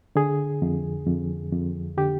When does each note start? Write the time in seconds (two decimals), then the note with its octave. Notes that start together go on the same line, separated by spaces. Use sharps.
0.16 D3 G#4
0.62 F2
1.07 F2
1.53 F2
1.98 D3 G4